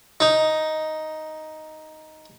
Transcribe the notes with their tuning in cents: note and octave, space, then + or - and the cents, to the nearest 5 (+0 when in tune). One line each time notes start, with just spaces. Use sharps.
D#4 +5